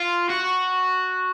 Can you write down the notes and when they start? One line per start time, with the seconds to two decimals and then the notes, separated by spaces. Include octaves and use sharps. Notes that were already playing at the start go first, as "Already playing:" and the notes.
Already playing: F4
0.29 F#4